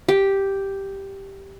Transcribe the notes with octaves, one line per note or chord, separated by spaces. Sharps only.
G4